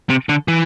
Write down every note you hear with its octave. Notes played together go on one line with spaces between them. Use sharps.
C3
D3
E3